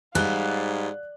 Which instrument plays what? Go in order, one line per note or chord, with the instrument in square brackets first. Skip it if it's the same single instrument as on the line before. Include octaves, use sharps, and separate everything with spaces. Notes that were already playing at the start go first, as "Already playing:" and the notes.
[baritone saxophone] G#2 [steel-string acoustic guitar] G3 [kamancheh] F5 F#5 [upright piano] F#6 G7